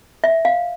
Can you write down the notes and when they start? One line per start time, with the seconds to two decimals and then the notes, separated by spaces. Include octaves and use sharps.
0.24 E5
0.45 F5